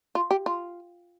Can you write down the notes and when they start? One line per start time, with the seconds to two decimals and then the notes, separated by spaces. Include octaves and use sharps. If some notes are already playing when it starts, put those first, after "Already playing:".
0.15 F4
0.31 G4
0.46 F4